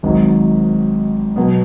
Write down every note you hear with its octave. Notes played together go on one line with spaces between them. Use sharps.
G#1 G#2 D#3 F#3
B2 F#3 B3